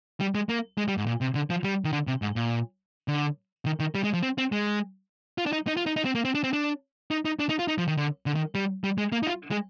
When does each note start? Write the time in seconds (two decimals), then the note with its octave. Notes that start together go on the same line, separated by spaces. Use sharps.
0.20 G3
0.35 G#3
0.49 A#3
0.78 G#3
0.88 G3
0.97 G#2
1.07 A#2
1.21 C3
1.35 D3
1.50 F3
1.64 G3
1.85 D#3
1.93 D3
2.07 C3
2.22 G#2
2.36 A#2
3.08 D3
3.66 D#3
3.80 D#3
3.95 G3
4.04 G#3
4.14 F3
4.23 C4
4.38 C4
4.52 G#3
5.38 F4
5.46 D4
5.53 D#4
5.67 D#4
5.77 F4
5.86 D#4
5.96 D#4
6.05 C4
6.15 A#3
6.25 C4
6.35 D4
6.44 C4
6.53 D4
7.11 D#4
7.25 D#4
7.39 D4
7.49 D#4
7.59 F4
7.68 D#4
7.78 F3
7.88 D#3
7.97 D3
8.26 D3
8.35 D#3
8.55 G3
8.84 G3
8.98 G#3
9.12 A#3
9.23 D#4
9.27 F4
9.51 G#3